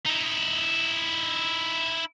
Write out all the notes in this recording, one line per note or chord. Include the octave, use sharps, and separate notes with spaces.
D#4 E4